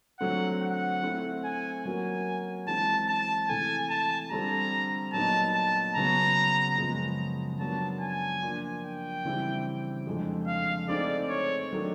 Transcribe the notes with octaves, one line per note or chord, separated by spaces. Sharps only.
D3 F#3 A3 C4 F#5
F#5
A3 C4 E4
G#5
F#3 A#3 C#4 F#4 A#4 G#5
E3 G#3 C4 A5
A5
C3 E3 A3 G#5
A5
D3 G3 C4 F4 A4 A#5
A#2 F#3 B3 D#4 A5
A5
C#3 F#3 B3 A#5
F#2 C#3 F3 G#3 B3
F#3 B3 D4 F4 A#4 A5
G#5
F3 A#3 D4 F4
G5
C#3 E3 G3 C4 E4
F2 D3 F3 G#3
F5
A3 C4 D#4 G#4 D5
C#5
D#3 F#3 A3 D4